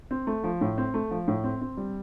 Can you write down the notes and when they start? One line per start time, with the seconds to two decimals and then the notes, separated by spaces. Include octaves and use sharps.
0.11 C4
0.27 A3
0.44 F3
0.61 A2
0.78 C4
0.94 A3
1.11 F3
1.28 A2
1.44 C4
1.61 C4
1.77 G3